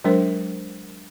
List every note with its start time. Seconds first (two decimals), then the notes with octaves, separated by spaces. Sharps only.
0.04 F#3 G#3 D4 A#4 C5